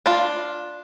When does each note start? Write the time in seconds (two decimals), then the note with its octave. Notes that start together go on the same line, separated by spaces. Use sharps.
0.06 D4 F4